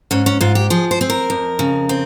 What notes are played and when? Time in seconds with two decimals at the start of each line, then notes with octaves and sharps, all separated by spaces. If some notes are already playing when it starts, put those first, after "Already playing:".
0.11 G#2 C#4
0.26 C#4
0.41 G#2 F4
0.55 G4
0.70 F3 G#4
0.91 C5
1.01 C4 G#4
1.10 A#4
1.30 F2
1.59 C#3
1.89 C4